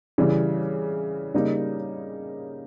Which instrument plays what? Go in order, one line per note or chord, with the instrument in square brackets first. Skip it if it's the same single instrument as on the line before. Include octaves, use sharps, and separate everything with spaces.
[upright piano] C#3 E3 G3
C#3 G3 A#3 D#4